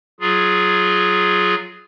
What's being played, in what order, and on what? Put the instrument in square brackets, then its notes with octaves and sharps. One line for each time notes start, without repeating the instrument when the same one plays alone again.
[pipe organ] F#3 F4 G#4